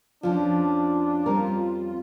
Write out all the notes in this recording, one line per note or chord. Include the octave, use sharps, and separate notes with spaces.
F2 F3 C#4 D4 F4
G3 C4 A#4